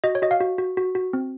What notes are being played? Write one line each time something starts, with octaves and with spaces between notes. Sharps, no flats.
F#4 D#5
C#5
F#4 D#5
F5
F#4
F#4
F#4
F#4
C4